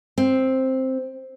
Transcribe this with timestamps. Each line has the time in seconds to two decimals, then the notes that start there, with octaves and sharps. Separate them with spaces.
0.18 C4